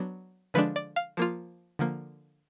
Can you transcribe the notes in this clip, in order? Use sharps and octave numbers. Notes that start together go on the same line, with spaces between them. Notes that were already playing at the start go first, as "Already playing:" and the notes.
Already playing: F#3 B3 D4
D3 F3 G#3 D4 B4
D5
F5
F3 A#3 F4
D3 F3 A#3